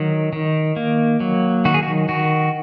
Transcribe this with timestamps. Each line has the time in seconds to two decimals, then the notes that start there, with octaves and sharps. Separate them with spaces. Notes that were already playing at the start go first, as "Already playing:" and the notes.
Already playing: D#3 F#3
0.33 D#3
0.76 A#3
1.20 F#3
1.65 D#3 F#4
1.74 G#4
1.83 F#4
2.09 D#3 F#4